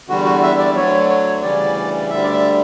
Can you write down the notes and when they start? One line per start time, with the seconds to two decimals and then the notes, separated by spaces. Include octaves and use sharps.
0.08 E2 D3 G3 F#4
0.25 F#4
0.43 E5
0.59 D5
0.75 D2 D3 F#3 C#5
1.10 C#5
1.43 D2 C#3 E3 G3 D5
2.10 D2 D3 G3 E5
2.24 D5
2.33 E5